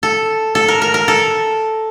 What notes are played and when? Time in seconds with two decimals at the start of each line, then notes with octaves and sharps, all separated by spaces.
0.03 A4
0.55 A4
0.68 A#4
0.82 A#4
0.94 A#4
1.08 A4